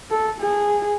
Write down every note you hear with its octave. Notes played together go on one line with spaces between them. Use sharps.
A4
G#4